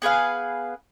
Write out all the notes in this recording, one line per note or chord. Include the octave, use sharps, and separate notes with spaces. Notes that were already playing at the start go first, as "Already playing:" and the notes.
B3 G#4 B4 F5